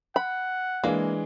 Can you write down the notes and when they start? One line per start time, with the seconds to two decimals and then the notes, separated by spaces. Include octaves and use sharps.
0.16 F#5 B5
0.83 E3 G#3 A#3 D4